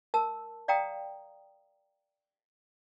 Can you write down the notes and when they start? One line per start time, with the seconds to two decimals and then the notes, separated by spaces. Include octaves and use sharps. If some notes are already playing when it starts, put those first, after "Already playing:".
0.14 A#4 A5 E6
0.68 D5 F5 G5 A#5 D#6